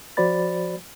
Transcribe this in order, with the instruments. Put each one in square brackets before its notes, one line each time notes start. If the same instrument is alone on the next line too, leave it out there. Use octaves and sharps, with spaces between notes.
[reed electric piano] F3 F#4 C5 D5 B5 A6